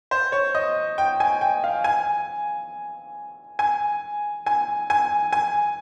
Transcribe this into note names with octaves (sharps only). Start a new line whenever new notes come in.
C5
C#5
D#5
G5
G#5
G5
F5
G#5
G#5
G#5
G#5
G#5